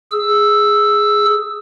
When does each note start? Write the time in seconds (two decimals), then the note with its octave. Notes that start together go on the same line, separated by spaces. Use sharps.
0.12 G#4 E6